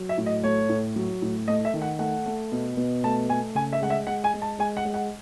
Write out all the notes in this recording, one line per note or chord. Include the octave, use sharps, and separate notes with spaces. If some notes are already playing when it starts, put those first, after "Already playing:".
Already playing: F#3
E5
A2
D#5
A3 C#5
A2
F#3
A2
A3 D#5
E5
D#3
F#5
A3 F#5
A3
B2
B2
A3 A5
A3 G#5
C#3 G#5
E5
G#3 F#5
E5
G#3 F#5
G#5
G#3
A5
G#3 G#5
F#5
G#3
F#5